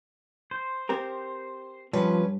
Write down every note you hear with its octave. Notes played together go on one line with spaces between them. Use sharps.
C5
C4 G4 A#4
G2 F3 C#4 B4